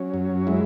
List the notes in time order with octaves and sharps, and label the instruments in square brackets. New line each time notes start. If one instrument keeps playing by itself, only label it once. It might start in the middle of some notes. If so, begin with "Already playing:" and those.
Already playing: [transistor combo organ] F#3 C#4
F#2
G#3 E4